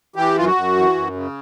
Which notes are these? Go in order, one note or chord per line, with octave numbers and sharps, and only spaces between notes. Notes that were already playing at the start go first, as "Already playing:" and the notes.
E3 G4
F#2 F4
F#4
F#2
E3
F#2
C#3